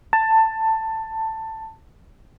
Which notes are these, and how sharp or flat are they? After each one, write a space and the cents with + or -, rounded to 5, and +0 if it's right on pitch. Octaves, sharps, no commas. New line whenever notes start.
A5 +15